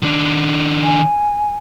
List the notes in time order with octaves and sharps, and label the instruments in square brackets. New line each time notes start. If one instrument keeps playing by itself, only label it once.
[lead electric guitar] D#3 D4
[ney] G#5